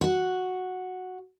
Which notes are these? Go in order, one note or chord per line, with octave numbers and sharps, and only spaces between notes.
F#4 F#5